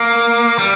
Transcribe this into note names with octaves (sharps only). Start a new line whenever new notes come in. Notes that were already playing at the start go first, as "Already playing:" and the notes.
Already playing: A#3
G3